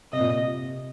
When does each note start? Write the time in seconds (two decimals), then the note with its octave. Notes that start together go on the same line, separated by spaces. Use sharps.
0.13 C3 D#5
0.20 A#2
0.28 C3